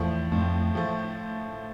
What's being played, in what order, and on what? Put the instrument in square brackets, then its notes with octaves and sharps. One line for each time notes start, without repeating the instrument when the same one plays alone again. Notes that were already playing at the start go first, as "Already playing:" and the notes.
Already playing: [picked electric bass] E2 [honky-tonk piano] A2 F3 A3
[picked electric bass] F2 [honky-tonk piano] A2
[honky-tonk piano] F3 A3